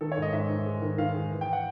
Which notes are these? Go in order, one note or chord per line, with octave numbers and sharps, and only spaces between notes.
D#3 A4
C#5
G#2 D#5
G#2 E5
G#2
G#3
D#3
D#3 F5
G#3
E3
G5
F#5